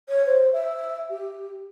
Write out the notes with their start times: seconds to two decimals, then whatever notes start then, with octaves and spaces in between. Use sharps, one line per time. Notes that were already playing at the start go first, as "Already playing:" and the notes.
0.08 C#5
0.26 C5
0.52 E5
1.10 G4